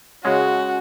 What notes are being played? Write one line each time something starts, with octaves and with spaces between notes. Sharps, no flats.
C#3 G#3 C#4 F#4